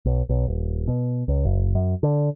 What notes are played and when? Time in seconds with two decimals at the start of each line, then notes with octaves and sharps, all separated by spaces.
0.05 B1
0.29 B1
0.48 D#1
0.88 B2
1.28 C#2
1.45 F#1
1.75 F#2
2.03 D3